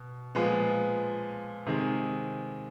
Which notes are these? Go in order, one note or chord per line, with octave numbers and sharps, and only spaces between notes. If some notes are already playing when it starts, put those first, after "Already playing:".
Already playing: B2
A#2 F3 G#3 B3
C3 D#3 G#3